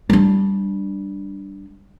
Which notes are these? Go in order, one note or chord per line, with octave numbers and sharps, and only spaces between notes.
G3 D4